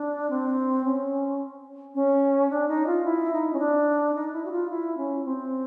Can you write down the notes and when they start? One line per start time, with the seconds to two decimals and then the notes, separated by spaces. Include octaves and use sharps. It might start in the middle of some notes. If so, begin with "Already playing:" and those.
Already playing: D4
0.30 C4
0.84 C#4
1.95 C#4
2.50 D4
2.68 D#4
2.86 F4
3.04 E4
3.32 D#4
3.53 C#4
3.59 D4
4.15 D#4
4.33 E4
4.45 F#4
4.51 F4
4.70 E4
4.97 C#4
5.25 C4